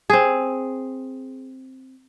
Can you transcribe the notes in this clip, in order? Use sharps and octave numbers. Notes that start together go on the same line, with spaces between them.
C4 G#4